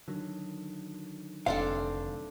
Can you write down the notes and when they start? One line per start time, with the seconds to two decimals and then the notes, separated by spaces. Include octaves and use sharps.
0.08 D3 D#3 F#3
1.46 F1 C4 D4 A4 F5